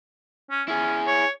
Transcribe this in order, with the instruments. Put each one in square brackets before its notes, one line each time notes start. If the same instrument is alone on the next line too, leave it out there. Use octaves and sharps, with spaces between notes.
[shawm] C#4
[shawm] C#4 [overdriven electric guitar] E4 G#4
[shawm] C#5